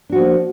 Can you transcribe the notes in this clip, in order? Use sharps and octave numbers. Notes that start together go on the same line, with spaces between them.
F3 A#3 D4 F#4